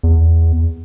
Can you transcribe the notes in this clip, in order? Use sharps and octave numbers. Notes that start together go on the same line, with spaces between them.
E2